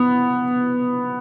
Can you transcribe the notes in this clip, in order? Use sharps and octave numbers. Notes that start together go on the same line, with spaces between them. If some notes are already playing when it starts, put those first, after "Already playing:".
Already playing: B3